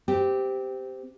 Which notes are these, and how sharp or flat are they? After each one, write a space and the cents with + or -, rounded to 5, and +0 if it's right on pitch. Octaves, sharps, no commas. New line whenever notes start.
C4 -15 G4 +0